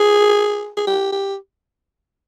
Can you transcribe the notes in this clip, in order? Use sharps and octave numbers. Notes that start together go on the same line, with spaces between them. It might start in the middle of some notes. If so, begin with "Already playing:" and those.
Already playing: G#4
G#4
G4
G4